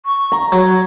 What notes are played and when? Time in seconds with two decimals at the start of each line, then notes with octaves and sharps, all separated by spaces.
0.06 C#6
0.32 A#5
0.52 F#3 C#5